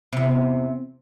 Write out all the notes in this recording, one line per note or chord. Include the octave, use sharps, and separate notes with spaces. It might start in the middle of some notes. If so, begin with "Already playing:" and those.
E2 C3